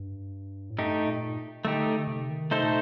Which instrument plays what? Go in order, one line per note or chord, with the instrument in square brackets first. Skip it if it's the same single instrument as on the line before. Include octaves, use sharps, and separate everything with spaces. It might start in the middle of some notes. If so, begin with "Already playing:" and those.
Already playing: [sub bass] G2
A2
[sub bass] G2 [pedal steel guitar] A3 D#4 G4
[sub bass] A#2
[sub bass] D3 [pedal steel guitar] A3 D#4 G4
[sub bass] D3
C3
D#3
[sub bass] C3 [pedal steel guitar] A3 D#4 A4 C5
[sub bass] A#2